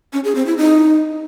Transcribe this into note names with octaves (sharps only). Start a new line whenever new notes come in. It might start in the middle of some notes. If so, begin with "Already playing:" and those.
C#4
G#4
C4
E4
D#4